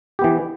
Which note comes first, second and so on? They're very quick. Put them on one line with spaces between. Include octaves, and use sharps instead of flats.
G4 B3 E3